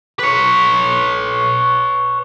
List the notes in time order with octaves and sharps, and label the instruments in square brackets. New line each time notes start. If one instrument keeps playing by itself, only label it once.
[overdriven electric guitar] B4 C#5